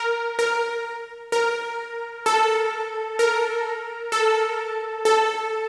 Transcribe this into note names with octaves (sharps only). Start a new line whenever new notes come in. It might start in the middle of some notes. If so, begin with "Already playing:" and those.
Already playing: A#4
A#4
A#4
A4
A#4
A4
A4